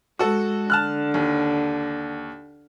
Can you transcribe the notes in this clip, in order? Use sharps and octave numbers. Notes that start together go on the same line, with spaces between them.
G#3 F#4 A4
D3 A5 F6 F#6
D#2